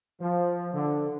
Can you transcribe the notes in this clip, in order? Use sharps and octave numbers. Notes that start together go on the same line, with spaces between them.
F3
D3